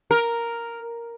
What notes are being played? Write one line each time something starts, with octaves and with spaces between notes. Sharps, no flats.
A#4